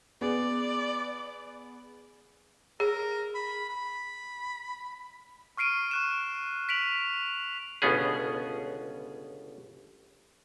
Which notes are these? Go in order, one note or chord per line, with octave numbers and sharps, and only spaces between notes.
B3 G#4 D5
G#4 A#4
B5
B5
C#6 F6 C7 D7 D#7
C#6 F#6 E7
B6 D7 F7 F#7
G1 C#2 B2 B3 C#4 G#4